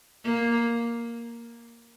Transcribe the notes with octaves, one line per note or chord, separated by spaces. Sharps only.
A#3